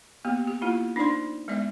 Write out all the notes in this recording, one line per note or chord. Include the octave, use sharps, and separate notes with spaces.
A#3 B3 G4
G4
A#3 E4 F4
D4 D#4 C5 D5 C6
G#3 B3 D5 E5